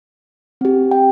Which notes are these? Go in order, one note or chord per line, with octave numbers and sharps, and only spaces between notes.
C4 G4
G5